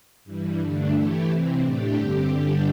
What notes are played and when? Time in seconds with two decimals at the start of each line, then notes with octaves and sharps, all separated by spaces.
0.24 G2 E3 G3
0.58 G2 D3 A3 D4
0.92 E3 A3 E4 G4
1.26 C3 E3 C4
1.60 A2 A3 D4 G4
1.93 G2 D3 C4 G4
2.28 G2 D3 G3 D4 G4